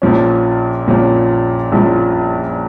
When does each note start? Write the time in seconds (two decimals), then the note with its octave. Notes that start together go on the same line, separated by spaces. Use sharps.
0.02 A#1 A#2 F3 C#4
0.87 A#1 A#2 F3 C#4
1.72 A#1 A#2 F3 C#4